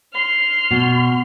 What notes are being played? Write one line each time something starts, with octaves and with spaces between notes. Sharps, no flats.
C6 F6
B2